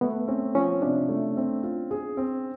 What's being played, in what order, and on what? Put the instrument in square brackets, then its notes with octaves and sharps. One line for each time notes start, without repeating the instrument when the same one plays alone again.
[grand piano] A3 [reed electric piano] B3
[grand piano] C4 [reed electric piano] C#4
[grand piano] F3 [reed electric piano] C#4
[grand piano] C3 [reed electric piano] D4
[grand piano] A3
C4
F4
G#4
C4